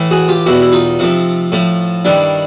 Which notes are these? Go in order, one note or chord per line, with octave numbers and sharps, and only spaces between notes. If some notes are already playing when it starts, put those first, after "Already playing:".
Already playing: A2 E3 A3
F#4 G#4
F4 G4
E2 B2 G3 E4 F#4
E4
D#4 F4
C3 F3 A3
A2 F3 A3
G2 D#3 G3 D4 E4